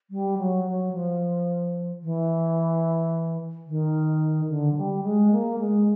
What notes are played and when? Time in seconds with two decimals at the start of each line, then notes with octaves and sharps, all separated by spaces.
0.10 G3
0.38 F#3
0.65 F#3
0.93 F3
2.02 E3
3.67 D#3
4.49 D3
4.72 F#3
4.76 G3
5.03 G#3
5.31 A#3
5.59 G#3